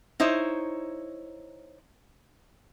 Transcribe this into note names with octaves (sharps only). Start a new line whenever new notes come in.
D#4 E4 C5 C#5